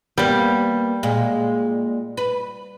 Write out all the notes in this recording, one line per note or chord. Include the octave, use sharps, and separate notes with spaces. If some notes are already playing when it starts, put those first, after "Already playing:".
G3 A#3 B3
A#2 G#3
B4